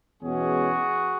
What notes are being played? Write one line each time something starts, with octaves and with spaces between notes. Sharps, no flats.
E2 B2 G#3 C#4 F#4 G#4